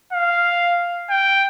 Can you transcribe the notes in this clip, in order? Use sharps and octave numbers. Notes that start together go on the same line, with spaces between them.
F5
G5